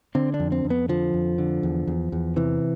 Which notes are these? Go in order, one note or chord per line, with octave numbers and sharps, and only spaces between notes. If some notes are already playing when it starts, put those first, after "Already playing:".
D3 C4
D4
F2
C4
F2
B3
D3 F3
F2
D3
E2
E2
E2
C3 E3